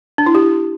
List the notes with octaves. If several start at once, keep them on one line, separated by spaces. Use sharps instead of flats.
D4
E4
G4